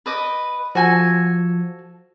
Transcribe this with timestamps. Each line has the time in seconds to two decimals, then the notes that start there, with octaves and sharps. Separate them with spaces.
0.06 B4 D#5 D6
0.75 F3 F#4 A4 G#5